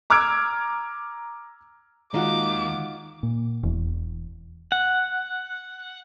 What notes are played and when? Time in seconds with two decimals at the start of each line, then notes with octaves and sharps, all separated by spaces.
0.10 A#5 D6 E6 F6 G#6 D7
2.14 D#2 D#3 G#3 D#4 F4 F#4 F#5 D6
3.23 A#2
3.63 E1 E2
4.72 F#5